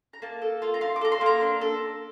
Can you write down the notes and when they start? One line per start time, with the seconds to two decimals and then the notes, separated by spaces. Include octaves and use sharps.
0.13 A#5
0.22 A#3 A5
0.42 A4
0.62 F4
0.74 A#5
0.81 F4 C6
0.96 D6
1.01 A4 A#5
1.12 C6
1.21 A#3 A#5
1.41 D4
1.61 A4